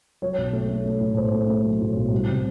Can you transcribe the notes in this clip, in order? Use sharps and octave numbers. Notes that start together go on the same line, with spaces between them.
F#3 C#5
B1
A3
A3
A3
A2
B1 C5
A3
A3
F#3
A2
B1
G3
C3